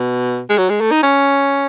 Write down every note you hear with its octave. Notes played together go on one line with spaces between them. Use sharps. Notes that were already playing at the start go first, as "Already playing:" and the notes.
Already playing: B2
G#3
F#3
G#3
A3
D#4
C#4